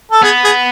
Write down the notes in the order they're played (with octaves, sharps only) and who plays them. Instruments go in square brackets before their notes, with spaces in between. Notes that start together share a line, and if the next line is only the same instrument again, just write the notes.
[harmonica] A4
[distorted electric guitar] B3 [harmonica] G#4
[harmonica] G#4